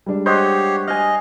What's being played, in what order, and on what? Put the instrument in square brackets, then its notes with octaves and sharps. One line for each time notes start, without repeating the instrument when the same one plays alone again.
[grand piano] G3 G#3 D4
[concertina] G4 C#5 [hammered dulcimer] C5 D#5 F#5
[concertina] D#5 [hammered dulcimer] F5 G#5